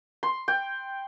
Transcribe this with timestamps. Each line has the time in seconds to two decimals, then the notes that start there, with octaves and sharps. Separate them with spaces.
0.23 C6
0.48 G5